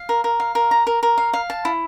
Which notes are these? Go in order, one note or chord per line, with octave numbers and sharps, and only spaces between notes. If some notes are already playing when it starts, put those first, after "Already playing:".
Already playing: F5
A#4
A#4
F5
A#4
A#5
A#4
A#4
F5
F5
A5
E4